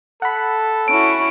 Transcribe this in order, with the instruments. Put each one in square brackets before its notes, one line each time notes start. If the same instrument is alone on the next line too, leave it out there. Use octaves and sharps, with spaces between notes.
[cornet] A4 [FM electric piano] F#5 B5
[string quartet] C#4 E4 F#4 [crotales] D7